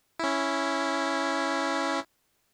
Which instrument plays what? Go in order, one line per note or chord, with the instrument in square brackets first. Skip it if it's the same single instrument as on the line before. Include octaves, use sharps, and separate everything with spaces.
[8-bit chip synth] C#4 E4